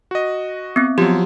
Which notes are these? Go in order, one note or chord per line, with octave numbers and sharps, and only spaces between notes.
F#4 D#5
B3 C4
F3 F#3 G4